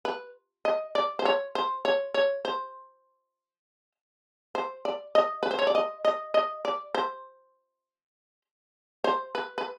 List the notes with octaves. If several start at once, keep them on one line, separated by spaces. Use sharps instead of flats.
B4
D#5
D5
C5
C#5
C5
C#5
C#5
C5
C5
D5
D#5
B4
C5
C#5
D5
D#5
D#5
D#5
D5
C5
C5
B4
B4